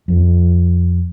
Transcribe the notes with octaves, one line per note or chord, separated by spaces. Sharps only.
F2